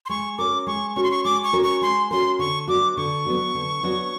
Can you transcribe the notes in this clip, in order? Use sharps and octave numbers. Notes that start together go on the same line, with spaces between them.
C6
G#3 C#6
C#4 F#4 A#4 D6
G#3 C#6
C#4 F#4 A#4 C#6
C6
C#6
G#3 D6
C#6
C#4 F#4 A#4
C#6
G#3 C6
C#4 F#4 A#4 C6
D3 C#6
F#3 B3 D4 F#4 D6
D3 C#6
F#3 B3 D4 F#4
D3
F#3 B3 D4 F#4